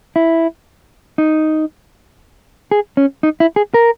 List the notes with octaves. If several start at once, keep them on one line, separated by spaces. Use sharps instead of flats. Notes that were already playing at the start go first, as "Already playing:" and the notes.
E4
D#4
G#4
C#4
D#4
E4
G#4
A#4